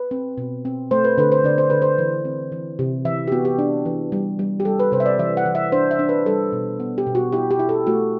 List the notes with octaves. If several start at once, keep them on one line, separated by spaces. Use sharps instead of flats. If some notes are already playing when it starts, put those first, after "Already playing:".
Already playing: B4
C4
B2
C4
A3 C5
B4
D3 B4
C5
D3 D5
C5
D3 B4
C5
E3
C4
E3
C3
E3 E5
G4
B3 F#4
G4
D4
E3
G3
G3
G4
G3 A4
B4
C3 C5
E5
D5
E3 E5
F#5
E3
E5
D4 C5
E5
D4
B4
G3 A4
B2
B3
G4
B2
F#4
E4 G4
G4
E4
A4
A3 F#4